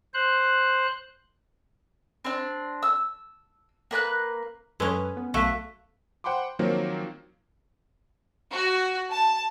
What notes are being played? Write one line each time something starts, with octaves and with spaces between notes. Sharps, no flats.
C5 F#6
C4 D4
E6
A#3 B4 A5 F#6
F#2 G#3 C#4 A4 B4
B3
B1 A3 F#4 F5 B6
C5 F#5 G5 B5 C6 D6
D#3 F3 F#3 A#3 C4
F#4
A5